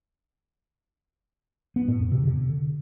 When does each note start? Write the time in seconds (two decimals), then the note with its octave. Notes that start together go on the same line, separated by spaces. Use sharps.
1.76 B3
1.88 A2
2.00 F2
2.12 C3
2.23 D3